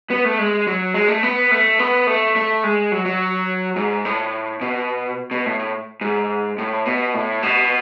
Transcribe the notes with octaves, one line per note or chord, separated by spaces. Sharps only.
B3
A3
G#3
F#3
G#3
A3
B3
A3
B3
A3
A3
G#3
F#3
F#3
G#2
A2
B2
B2
A2
A2
G#2
A2
B2
A2
B2